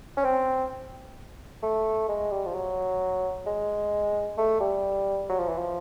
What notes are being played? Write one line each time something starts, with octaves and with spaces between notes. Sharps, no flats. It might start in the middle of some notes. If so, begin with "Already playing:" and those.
C#4
C4
A3
G#3
G3
F3
F#3
G#3
A3
G3
F#3
F3
E3
F3